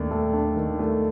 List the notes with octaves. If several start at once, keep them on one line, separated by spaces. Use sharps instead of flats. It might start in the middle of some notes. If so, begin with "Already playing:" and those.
Already playing: D#2 A3 D4
A3
D4
D#3
A3